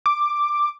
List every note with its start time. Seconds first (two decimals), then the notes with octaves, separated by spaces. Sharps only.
0.06 D6